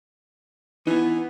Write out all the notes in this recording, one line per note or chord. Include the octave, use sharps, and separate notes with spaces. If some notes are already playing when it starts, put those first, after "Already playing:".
E3 B3 D#4 G#5